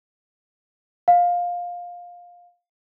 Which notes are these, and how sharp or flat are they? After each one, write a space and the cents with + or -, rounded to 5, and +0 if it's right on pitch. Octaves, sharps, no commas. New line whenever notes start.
F5 +15